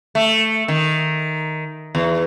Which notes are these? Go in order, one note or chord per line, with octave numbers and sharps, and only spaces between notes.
A3
D#3
E2